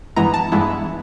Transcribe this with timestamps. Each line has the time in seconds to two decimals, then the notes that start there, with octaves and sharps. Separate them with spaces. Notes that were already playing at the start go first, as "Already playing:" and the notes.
0.16 G2 E3 G#3 B3 E4 A#5
0.34 A5
0.52 G2 E3 G#3 B3 E4